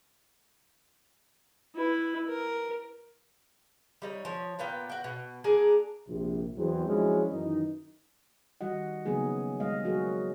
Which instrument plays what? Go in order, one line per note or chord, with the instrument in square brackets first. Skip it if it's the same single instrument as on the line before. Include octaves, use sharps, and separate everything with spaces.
[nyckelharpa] E4 B4
A#4
[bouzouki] G3 D#4 C#5
F3 C#5
A#2 B3 F4 G5
F#4 G5
B2
A#3 D4 G#4 A#4
[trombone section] A#1 C3
E2 F#3 C4
F3 F#3 G#3 C#4 D4 E4
F#2 D#3 E3 D#4
[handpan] D#3 G3 F#4 D#5 F#5
C#3 F#3 A#3 B3 D#4 G#4
G3 G#3 D#5 F5
F#3 F#4 G#4 A#4